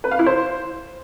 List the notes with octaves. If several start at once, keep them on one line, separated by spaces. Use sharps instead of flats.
B4
F5
E4
C5